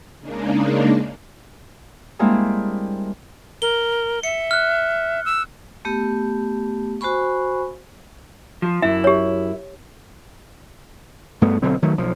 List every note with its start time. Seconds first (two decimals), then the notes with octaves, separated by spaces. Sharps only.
0.19 C#3 G#3 A#3 D4 D#4
2.19 G3 G#3 A#3 C4 D4 E4
3.62 A#4 G7
4.23 E5 C#7
4.51 F6 F#6
5.25 E6
5.85 A3 B3 G4
7.01 F#4 C5 G#5 B5 C#6
8.62 F3
8.82 F#2 E4 E5
9.04 G4 C#5
11.41 G2 A3 B3
11.62 B1 D3 F#3 C4
11.82 D#3 F#3 A3
11.98 B1 F3